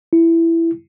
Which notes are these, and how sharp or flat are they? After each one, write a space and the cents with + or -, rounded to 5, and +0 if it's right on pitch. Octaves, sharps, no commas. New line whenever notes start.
E4 +10